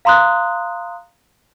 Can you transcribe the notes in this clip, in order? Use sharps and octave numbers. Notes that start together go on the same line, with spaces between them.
F5 A#5 C6 D#6 F#6